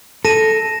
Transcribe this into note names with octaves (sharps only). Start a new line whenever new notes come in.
A4 A#6 D#7 E7